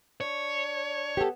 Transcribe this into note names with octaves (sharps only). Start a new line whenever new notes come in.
D4 C#5
B3 G4 A4